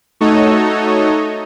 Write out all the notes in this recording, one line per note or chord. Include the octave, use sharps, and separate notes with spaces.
A3 D#4 F#4 A4 C#5 D#5